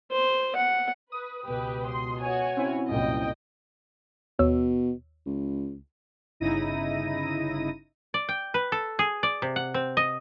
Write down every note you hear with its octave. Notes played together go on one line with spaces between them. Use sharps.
C5
F#5
B4 D#6
C#2 B2 G4 B4
C6
F#4 C#5 G#5
C4 C#4 E4
C2 F#2 A#2 D#5 G5
D#2 B2 C#5 E6
C#2
G1 C#3 D#4 E4 A#6 D#7
D5
G5
B4
A4
G#4
D5
C3
F#5
C4
D#5